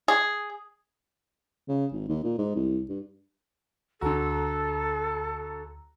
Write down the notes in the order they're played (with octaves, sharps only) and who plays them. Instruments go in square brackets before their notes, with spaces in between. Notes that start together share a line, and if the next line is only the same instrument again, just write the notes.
[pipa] G#4
[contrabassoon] C#3
G#1
D#2
A#2
G#2
C2
G2
[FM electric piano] D2 A#5 E6 [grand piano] D3 F#4 [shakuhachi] A4